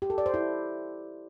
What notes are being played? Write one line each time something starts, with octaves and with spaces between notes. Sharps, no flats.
G4
A4
D5
C5
E4